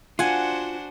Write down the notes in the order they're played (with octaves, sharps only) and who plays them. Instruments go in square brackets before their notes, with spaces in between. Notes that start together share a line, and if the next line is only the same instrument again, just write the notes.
[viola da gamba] D4 F#4 C5 [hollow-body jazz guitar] F4 [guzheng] F#5 G#5